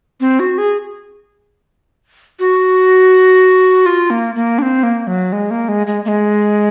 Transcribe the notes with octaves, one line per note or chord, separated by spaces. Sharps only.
C4
F#4
G#4
F#4
F4
A#3
A#3
D4
C4
A#3
F#3
G#3
A#3
G#3
G#3
A#3
G#3